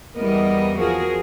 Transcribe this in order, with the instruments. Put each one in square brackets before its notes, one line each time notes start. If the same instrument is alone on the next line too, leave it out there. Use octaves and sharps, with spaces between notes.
[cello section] E2 G3 B3 A#4 D#5
F3 F#4 G#4 A#4